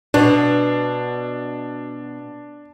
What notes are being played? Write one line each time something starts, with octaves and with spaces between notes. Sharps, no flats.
B2 D4